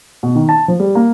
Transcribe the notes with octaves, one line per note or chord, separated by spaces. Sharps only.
B2
D#3
A5
F3
G3
A#3